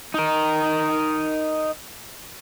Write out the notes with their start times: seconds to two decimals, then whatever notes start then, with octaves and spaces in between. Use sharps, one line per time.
0.14 D#4 A#4